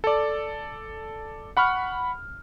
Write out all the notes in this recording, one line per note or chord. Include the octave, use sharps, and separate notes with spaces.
A4 D5
F#5 B5 C#6 F6